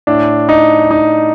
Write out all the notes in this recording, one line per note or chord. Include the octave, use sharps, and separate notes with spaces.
A2 D4
D#4
D#4